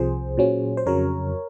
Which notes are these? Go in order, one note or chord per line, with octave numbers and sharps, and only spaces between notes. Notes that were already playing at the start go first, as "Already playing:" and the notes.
Already playing: C2 C3 F3 G#4 C5
A#2 F#3 C#4
C5
F2 C#3 F#3 A#4 C#5